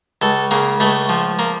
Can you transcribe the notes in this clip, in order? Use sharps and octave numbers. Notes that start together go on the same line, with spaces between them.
C#2 A4
C#3 A#3
C#2 A3
F3
A#3